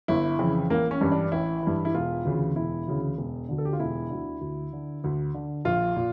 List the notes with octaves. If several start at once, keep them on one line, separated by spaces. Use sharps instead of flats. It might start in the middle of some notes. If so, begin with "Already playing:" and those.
G1 E4
F2 C#3 E3
A1 A#3
C#4
G2 E3
D4
A1 E4
G2 E3
E4
E1 F4
D2 C#3 E3
E1 E4
D2 C#3 E3
E1
D2 D3
A4
G4
F4
E1 E4
D2 D3
D2
D3
D2
D3
A#1 F4
A#2